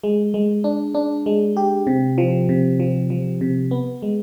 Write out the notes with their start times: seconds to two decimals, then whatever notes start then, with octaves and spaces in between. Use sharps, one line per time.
0.04 G#3
0.34 G#3
0.64 D4
0.95 D4
1.26 G#3
1.57 G4
1.87 C3
2.18 F3
2.49 C3
2.80 F3
3.10 F3
3.41 C3
3.71 B3
4.02 G#3